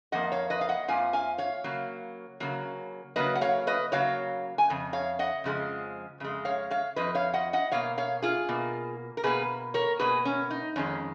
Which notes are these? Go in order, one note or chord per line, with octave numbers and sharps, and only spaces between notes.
F2 F3 A#3 D#5 F#5
C#5 F5
B4 D#5
F5
D#5 F#5
F2 F3 A#3 F5 G#5
F5 G#5
C#5 F5
C#3 F#3 A#3
C#3 F#3 A#3
C#3 F#3 A#3 B4 D#5
F#5
C#5 F5
B4 D#5
C#3 F#3 A#3 C#5 F5
G#5
F2 C#3
C#5 F5
D#5 F#5
F2 C#3 F3 G#3
F2 C#3 G#3
C#5 F5
C#5 F5
F2 C#3 F3 B4 D#5
C#5 F5
D#5 F#5
D#5 F#5
B2 A#3 C#5 F5
C#5 F5
F4 G#4
B2 A#3
A#4
B2 A#3 G#4 B4
A#4 C#5
B2 A#3 G#4 B4
C#4
D#4
F2 D#3 G#3 C#4